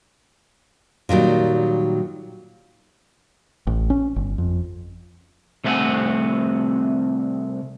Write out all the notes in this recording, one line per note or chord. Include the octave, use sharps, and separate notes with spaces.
A#2 D#3 F#3 G3
A1
C#4
G1
F2
C2 A3 B3 C4 F#5 G#5